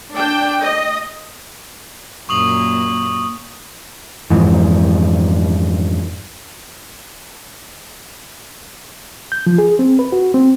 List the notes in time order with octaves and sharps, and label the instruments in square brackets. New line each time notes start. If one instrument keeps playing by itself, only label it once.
[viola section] D4 G5
D#5
[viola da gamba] F#2 A#2 A#3 [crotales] C#6 D#6 F#7
[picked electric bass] F2 G#2 E3
[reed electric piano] G6
F3
G#4
C4
B4
F#4
C4